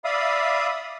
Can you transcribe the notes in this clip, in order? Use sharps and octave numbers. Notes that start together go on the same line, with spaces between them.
D5 E5 F5 B5 D#6